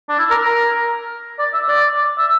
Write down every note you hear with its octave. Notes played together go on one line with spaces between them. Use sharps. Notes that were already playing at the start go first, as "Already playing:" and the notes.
D4
E4
A#4
A#4
D5
E5
D5
E5